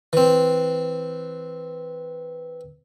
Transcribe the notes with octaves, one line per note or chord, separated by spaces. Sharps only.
E3 C4